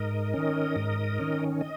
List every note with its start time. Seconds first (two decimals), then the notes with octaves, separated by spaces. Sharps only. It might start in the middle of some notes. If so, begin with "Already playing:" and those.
Already playing: G#2 A#4 D#5
0.34 D#3 C#4
0.76 G#2
1.19 D#3 C#4
1.61 D#5